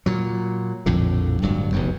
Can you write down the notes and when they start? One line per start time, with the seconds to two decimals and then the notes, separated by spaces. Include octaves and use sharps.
0.06 A#2 F#3
0.86 A#1 F2 A2 D3
1.42 D1 G2 F#3
1.72 F1 B1 F#2